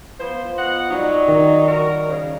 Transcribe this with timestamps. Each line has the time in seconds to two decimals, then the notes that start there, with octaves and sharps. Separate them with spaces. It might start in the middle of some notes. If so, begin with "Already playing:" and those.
0.20 F3 B3 C5
0.58 B3 D#5 F#5
0.91 F#3 G3 D#4 C#6
1.28 D#3
1.67 F#4 A#4
2.07 C#3